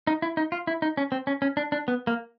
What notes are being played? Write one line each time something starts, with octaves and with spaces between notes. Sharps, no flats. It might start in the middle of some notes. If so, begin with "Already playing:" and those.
D#4
E4
D#4
F4
E4
D#4
C#4
C4
C#4
C#4
D4
D4
B3
A#3